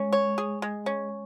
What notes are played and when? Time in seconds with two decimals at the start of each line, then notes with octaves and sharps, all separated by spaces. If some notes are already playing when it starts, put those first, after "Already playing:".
Already playing: G#3 C#4
0.12 C#5
0.38 G#4
0.62 G#3
0.86 C#4